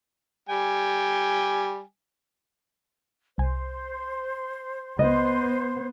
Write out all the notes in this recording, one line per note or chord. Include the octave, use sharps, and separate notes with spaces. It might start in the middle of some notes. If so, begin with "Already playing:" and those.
G3 G5 G#5
C2 C5 G#5
C#2 B3 C5 D#5